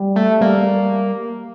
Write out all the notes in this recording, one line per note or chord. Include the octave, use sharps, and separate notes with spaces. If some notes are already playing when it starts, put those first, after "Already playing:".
Already playing: G3
A3
G3 A#3